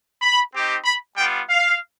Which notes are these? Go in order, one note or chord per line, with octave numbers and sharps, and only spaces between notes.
B5
C4 D#4 G4
B5
G3 B3 F4 G5
F5